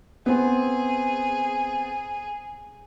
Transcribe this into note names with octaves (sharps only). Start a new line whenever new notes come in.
B3 C4 G#4